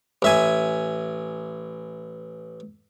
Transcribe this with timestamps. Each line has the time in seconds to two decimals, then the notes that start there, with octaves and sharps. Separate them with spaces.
0.22 A1 E5 G#5